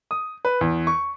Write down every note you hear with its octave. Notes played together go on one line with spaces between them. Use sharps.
D#6
B4
E2
C#6